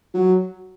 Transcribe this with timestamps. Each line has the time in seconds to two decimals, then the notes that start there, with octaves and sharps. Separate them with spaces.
0.14 F#3